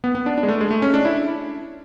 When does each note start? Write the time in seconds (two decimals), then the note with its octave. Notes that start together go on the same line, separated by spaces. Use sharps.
0.04 B3
0.15 B3
0.26 D4
0.38 D4
0.43 G#3
0.48 A3
0.61 G#3
0.71 A3
0.82 C#4
0.94 D4
1.05 E4